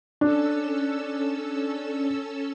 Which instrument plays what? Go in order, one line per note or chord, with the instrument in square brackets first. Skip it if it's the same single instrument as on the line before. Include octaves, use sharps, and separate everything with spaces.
[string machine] C#4 A4 E6 [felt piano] D4